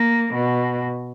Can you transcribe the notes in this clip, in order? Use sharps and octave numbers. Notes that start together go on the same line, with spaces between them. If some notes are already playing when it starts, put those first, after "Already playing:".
Already playing: A#3
B2